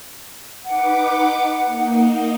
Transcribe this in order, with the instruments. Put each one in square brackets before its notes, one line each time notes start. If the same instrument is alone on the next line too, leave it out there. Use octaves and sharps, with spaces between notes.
[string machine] D#4 B4 D6 [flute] F#5
[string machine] A#3 D#4